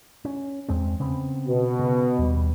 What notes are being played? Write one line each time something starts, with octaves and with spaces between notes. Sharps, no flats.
C#4
E2 G#3 C4
C#3 B3 C4
B2
C#3
D#2 G3